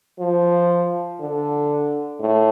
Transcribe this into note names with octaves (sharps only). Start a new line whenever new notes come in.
F3
D3
A2